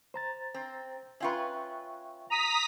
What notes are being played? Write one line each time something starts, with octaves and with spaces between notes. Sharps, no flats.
C5 A#5 A6
C4
C#4 F4 B4 E5 G5 C#6
A#5 D#6 B6